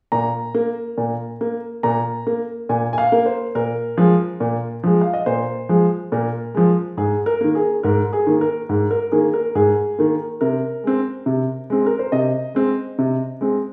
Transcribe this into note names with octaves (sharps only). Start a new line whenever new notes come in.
A#2 A#5
A#3
A#2
A#3
A#2 A#5
A#3
A#2 G#5
G#5
F5
A#3
C5
A#2 A#4
F3 G#3
A#2
F3 G#3
F5
D#5
A#2 C5
F3 G#3
A#2 A#4
F3 G#3
G#2 G#4
A#4
D#3 A#3
G#4
G#2 A#4
G#4
D#3 A#3
A#4
G#2
A#4
D#3 A#3 G#4
A#4
G#2 G#4
D#3 A#3
C3 A#4
G#3 C4
C3
G#3 C4
A#4
C5
C3 D#5
G#3 C4
C3
G#3 C4